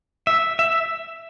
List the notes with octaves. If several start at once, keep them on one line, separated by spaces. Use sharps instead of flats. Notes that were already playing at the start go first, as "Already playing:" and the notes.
E5
E5